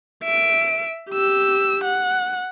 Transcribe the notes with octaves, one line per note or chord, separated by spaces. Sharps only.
E5 D7
G4 E6
F#5